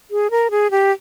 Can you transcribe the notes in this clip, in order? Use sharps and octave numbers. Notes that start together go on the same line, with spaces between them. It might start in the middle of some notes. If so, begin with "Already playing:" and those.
G#4
A#4
G#4
G4